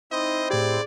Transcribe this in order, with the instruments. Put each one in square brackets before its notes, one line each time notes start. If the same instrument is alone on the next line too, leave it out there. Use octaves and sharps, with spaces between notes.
[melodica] C4 E4 C5 [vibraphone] D#4 [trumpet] D#5
[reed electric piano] A2 G4 [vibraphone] G#4 [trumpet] D5